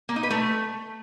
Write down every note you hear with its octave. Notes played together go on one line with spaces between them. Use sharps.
A#3
D#4
B4
A3